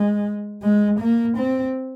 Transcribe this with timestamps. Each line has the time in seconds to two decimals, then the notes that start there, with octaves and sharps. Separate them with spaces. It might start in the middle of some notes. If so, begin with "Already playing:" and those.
Already playing: G#3
0.62 G#3
0.99 A#3
1.37 C4